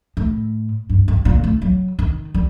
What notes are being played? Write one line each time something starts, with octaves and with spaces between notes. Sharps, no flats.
A2
G2
G2
A#2
A3
F#3
D#3
G3